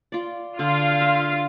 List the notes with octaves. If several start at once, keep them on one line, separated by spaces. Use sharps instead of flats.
F4 D5
D3 F4 F5
E5